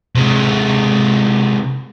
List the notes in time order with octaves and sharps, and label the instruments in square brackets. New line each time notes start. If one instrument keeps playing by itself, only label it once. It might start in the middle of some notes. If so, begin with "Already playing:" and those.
[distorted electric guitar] C3 G#3